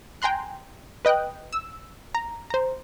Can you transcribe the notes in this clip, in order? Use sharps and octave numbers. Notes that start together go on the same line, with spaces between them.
G5 G#5 A#5 C6 F#6
B4 D#5 G5 D#6 F#6
E6
A#5
C5 A#5